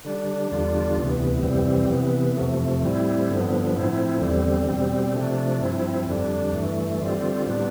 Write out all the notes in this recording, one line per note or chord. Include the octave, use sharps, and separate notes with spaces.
D3 G3 D4
E2 D3 G3 D4 F4
D2 C3 E3 B3
F2 C3 E3 G3 C4
C3 E3 B3
F2 C3 F3 A3
A2 G3 C4 E4
G2 D3 F3 B3
A2 F3 C4 E4
E2 D3 G3 C4
B2 G3 C4
C3 F3 A3 D4
G2 F3 C4 E4
F2 D3 G3 D4
G2 E3 A3
D3 G3 C4 F4
A2 G3 B3 D4